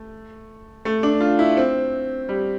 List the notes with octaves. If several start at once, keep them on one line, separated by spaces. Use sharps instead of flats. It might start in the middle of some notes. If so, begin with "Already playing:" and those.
Already playing: A3
A3
D4
F4
E4
C4
G3